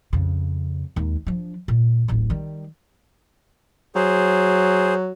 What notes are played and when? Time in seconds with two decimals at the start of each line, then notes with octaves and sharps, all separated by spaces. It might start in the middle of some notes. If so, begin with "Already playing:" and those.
0.13 F2 C#3
0.96 D#2 G#3
1.27 F3 D4
1.68 A#2
2.08 D1 A1
2.30 D#3 G3
3.95 F#3 G#4 C5